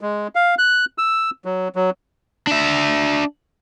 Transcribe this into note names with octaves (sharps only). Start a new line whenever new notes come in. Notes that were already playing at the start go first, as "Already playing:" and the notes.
G#3
F5
F#6
E6
F#3
F#3
D4 E5